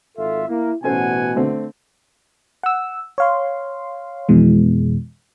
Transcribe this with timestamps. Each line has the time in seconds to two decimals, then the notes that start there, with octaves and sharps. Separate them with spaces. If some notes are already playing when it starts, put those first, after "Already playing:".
0.17 G#1 F4 A4 E5
0.49 A#3 E4
0.84 A1 B2 C#4 A4 C5 F#5 G#5
1.36 D3 A3 C4
2.63 F#5 E6
3.18 C#5 F5 C6
4.29 F2 B2 E3 G#3